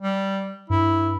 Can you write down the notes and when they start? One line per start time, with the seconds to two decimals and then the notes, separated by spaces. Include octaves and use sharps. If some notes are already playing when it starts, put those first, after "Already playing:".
0.01 G3
0.70 G2 E4